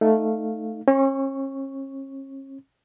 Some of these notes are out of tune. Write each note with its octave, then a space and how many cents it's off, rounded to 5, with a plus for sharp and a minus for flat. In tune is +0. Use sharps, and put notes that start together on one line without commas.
A3 +0 D#4 +0 F5 +0
C#4 -40 C#6 +0